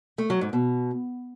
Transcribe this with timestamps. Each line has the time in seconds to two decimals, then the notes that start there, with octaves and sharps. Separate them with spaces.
0.18 A3
0.30 F#3
0.41 G#2
0.53 B2